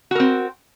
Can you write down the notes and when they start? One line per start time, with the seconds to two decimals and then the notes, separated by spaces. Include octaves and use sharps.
0.11 F#4
0.15 A#4
0.20 C4